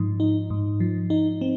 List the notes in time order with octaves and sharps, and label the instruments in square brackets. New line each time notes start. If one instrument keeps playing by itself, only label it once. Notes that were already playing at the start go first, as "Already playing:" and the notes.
Already playing: [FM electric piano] G#2 F3 D#4
D#4
G#2
F3
D#4
C4